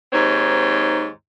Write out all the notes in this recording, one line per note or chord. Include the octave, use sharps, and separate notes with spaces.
D#2 G#2 C4 C#5